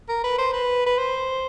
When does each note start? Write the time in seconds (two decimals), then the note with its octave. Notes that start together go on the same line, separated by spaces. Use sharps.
0.09 A#4
0.24 B4
0.38 C5
0.53 B4
0.86 B4
0.98 C5